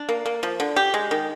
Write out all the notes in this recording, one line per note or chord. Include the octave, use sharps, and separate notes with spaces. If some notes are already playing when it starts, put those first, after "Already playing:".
Already playing: D4
A#3
A#3
F3
D3
G4
G#3
D#3